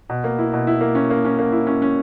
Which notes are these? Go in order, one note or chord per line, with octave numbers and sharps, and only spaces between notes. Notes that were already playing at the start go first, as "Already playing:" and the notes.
B2
A#3
E4
B2
E4
A#3
C#4
A#3
C#4
A#3
E4
C#4
C#4